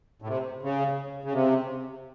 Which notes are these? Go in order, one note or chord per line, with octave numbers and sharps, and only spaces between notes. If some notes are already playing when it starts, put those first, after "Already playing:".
A2
C3
C#3
C#3
C3